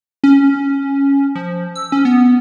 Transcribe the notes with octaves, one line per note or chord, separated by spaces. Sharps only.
C#4
F3
E6
C#4
B3